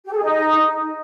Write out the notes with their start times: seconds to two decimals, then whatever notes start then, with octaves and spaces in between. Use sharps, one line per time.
0.06 G4
0.12 A4
0.17 G#4
0.22 D#4